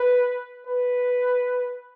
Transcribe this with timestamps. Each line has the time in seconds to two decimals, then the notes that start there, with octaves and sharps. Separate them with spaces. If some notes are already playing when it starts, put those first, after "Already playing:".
Already playing: B4
0.67 B4